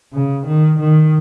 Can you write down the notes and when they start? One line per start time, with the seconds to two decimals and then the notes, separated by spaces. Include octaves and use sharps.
0.14 C#3
0.47 D#3
0.80 D#3